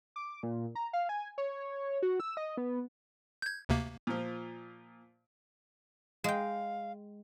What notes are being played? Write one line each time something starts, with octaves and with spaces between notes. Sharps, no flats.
D6
A#2
A#5
F5
G#5
C#5
F#4
E6
D#5
B3
G6 G#6
D2 C3 A#3
A#2 F3
G#3 F5 G5